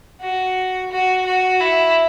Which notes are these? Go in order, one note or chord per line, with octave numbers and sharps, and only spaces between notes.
F#4
F#4
F#4
E4